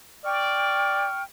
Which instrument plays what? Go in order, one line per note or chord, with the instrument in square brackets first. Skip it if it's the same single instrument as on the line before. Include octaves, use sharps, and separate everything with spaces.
[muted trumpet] D5 [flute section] G5 C#6 F6